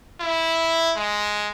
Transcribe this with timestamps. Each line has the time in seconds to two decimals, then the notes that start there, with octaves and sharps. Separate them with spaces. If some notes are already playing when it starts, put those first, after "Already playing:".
0.20 E4
0.96 G#3